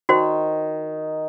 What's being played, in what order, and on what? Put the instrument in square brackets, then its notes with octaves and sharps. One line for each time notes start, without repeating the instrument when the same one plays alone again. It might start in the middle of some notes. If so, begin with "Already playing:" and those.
[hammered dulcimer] D#3 [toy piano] F#4 C5